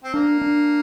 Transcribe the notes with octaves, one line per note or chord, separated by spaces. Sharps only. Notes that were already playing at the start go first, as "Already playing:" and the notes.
C4
A#3 D4
D4